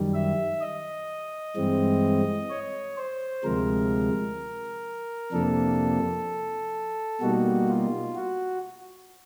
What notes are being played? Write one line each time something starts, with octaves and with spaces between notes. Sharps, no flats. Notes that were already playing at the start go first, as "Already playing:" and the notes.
Already playing: F#2 D#3 G3
E5
D#5
G2 E3 G#3 C4
C#5
C5
D2 C3 F3 G#3 A#4
F2 C3 F3 A#3 D4 A4
B2 G3 A#3 D#4 F#4
F4
F#4